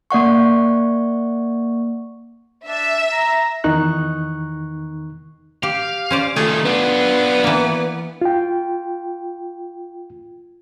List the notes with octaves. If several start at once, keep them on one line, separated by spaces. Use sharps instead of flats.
A#3 D5 F#5 C#6
D4 E5
A#5
E2 D#3 D#4 C#6 F#6
G4 F5
C#4 C5 D5
D#3 F3 A3 G#4
B3 D4 F4
E3 A#3
F4 G5